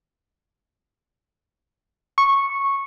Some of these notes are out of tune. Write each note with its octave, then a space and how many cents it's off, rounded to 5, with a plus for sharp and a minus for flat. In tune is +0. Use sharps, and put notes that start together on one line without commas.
C#6 -10